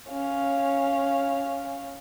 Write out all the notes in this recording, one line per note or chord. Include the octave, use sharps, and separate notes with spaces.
C#4 F5